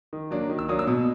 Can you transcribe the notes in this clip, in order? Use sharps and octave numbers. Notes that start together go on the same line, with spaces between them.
D#3
F#3 A#3 D4
D#3
E6
F#3 A#3 D4 D#6
E6
B2